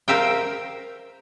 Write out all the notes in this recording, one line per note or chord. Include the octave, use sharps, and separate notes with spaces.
A#4 C5 E5 F5 G5